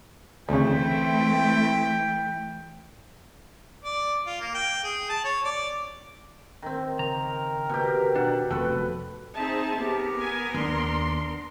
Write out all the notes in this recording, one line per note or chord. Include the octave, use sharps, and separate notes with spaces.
D2 C#3 E3 A3 C4 E4 G5
D5
F4
A#3
G5
G#4
A5
C#5
D5
D#3 C4
C#3 A#4 A#5
B2 G4
B2 D4 F#5
F1 F3 F#4 A4 B4 G5
C4 D#4 G#4 E5 A5
B3 G4 A#4
G#5
D#2 D4 C6